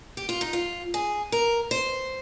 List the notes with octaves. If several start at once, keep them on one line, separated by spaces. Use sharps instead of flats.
G4
F4
D#4
F4
G#4
A#4
C5